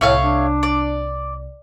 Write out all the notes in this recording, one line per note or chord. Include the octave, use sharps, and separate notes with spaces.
C2 A2 A3 C#5 F5
D4
D5